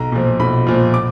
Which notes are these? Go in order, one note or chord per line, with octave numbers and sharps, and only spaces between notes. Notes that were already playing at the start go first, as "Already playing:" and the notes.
Already playing: B1 A#5
A#2 F3
B1 B5
A#2 F3
D6